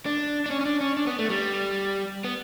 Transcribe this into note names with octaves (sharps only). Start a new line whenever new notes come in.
D4
D4
C#4
C#4
D4
C#4
D4
B3
A3
G3
B3